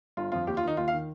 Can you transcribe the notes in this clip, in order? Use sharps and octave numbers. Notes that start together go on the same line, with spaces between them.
G1 F4
F2 F3 F4
D#2 G4
F4
D#3 D#4
D#2 F4
F5
D#3